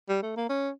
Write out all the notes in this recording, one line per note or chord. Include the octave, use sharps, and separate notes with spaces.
G3
A3
A#3
C#4